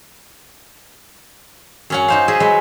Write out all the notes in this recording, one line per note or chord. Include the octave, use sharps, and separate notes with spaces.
F#2 C#4 F#5
D#4 C5 F5
G#4 D#5 E5
F#3 G#3 B4